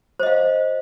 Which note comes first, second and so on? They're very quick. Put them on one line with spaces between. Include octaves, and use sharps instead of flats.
C5 D#5 F5